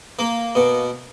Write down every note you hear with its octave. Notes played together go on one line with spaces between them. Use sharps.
A#3
B2